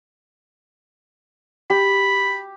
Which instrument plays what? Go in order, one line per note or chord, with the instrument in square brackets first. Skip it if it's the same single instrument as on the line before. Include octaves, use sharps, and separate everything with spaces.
[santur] G4 [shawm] B5